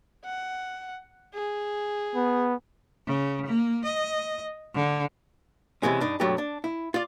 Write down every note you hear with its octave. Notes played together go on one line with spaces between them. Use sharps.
F#5
G#4
B3
C#3
A#3
D#5
D3
E2 C3 E3 G#3 C#4
G2 D4 D#4
B1 G2 F#3 A3 G4
D4
E4
F4 D5